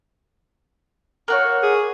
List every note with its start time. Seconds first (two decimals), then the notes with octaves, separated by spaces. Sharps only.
1.28 A#3 F#4 C#5
1.63 G#4